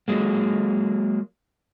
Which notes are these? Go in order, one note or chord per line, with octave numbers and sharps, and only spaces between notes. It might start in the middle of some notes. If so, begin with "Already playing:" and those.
F#3 G#3 A#3